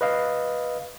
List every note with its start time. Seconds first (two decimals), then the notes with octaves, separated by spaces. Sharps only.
0.01 B4 D#5 F5